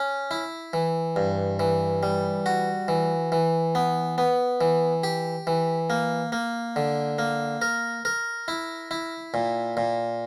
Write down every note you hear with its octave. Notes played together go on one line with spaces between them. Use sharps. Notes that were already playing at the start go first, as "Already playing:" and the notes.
Already playing: C#4
E4
E3
G2
E3
G3
F#4
E3
E3
B3
B3
E3
G4
E3
A#3
A#3
D3
A#3
A#4
A#4
E4
E4
A#2
A#2